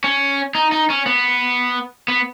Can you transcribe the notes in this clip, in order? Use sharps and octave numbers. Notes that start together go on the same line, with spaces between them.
C#4
D#4
D#4
C#4
B3
B3